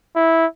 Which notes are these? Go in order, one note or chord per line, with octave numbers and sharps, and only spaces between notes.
E4